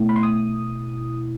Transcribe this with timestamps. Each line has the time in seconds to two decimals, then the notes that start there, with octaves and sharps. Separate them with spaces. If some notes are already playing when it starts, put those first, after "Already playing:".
Already playing: B2 A3 E4
0.09 B5
0.16 C6
0.23 D#6